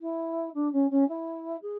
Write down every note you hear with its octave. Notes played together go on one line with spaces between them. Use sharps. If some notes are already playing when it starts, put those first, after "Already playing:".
E4
D4
C#4
C#4
E4
G#4